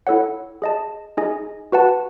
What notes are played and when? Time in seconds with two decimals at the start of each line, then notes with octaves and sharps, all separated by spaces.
0.07 E4 A4 C#5 F#5
0.62 G#4 D#5 A5
1.17 D#4 G#4 D#5 G#5
1.72 F#4 B4 F#5 A5